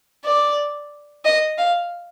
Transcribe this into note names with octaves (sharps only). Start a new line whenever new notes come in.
D5
D#5
F5